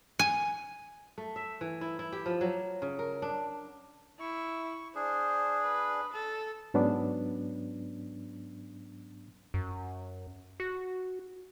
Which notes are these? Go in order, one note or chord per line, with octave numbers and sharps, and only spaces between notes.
G#5
A3
E5
E3
E4
E4
G4
F3
F#3
C#3
A#4
D4
E4 C#6
D4 G#4 C5
B4
A4
G#2 F#3 B3 C#4 D4
F#2
F#4